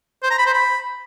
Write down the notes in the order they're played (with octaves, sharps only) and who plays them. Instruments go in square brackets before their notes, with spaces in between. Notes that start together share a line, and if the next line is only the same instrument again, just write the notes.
[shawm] C5
A#5
B5
C5
B5